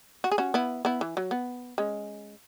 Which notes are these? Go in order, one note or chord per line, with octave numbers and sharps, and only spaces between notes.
F#4
G#4
C#4 F#4
B3 E4
B3 E4
E3
F#3
B3
G#3 C#4